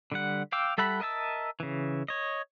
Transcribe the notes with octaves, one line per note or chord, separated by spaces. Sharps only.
D3 G3 F#5
F5 G5 D6 E6
G3 A4 E5 F#5 B5
A#4 D#5 E5 A5 E6
C#3 E3
C#5 D#5